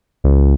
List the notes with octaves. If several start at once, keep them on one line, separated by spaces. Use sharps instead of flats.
C#2